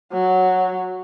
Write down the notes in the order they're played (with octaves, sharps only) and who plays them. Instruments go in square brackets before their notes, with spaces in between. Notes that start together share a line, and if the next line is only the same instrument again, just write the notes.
[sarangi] F#3